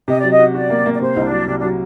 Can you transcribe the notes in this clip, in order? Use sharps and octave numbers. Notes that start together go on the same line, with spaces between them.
C3 D#5
F#3 D5
D#5
F#4
F#4 D5
A#3
A#3
D5
C3 C5
C2 D#4
D4
F#3
C3 D4
D4
F#3